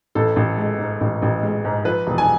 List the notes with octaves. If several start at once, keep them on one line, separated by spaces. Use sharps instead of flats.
A1 A4
A1
G#3
G#2
A1
A1
G#3
G#2
F3 B4
E1
G#5